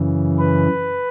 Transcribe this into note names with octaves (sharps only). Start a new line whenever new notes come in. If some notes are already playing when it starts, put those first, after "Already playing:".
Already playing: F#2 C#3 E3
B4